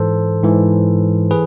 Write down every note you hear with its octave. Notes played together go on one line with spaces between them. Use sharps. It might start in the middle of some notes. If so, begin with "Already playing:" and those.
Already playing: G#2 E3 A4 C5
G#2 E3
E3 G#4 B4